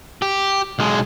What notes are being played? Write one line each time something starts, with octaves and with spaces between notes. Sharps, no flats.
G4
B1 G#3